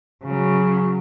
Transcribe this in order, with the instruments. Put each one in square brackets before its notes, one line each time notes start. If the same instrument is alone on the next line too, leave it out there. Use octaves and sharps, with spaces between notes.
[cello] C#3 F#3